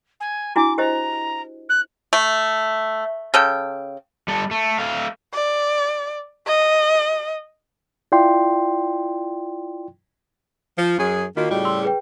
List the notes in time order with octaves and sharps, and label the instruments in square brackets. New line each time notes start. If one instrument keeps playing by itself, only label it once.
[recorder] G#5
[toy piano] D4 E4 F#4 [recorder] D6
[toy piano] G4 C5 D#5 [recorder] A#5
[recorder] F#6
[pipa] A3
C#3 A4 G5
[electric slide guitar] G3 A4
A3
A3 A4 F5
[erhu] D5
D#5
[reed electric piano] E4 F4 D5 G5 C6
[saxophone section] F3
F#2 G#4
[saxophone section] D#3 A#3 [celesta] F4 F#4 D#5
[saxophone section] A2 C#3 G3
[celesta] C6 E6
G#4 B4 G5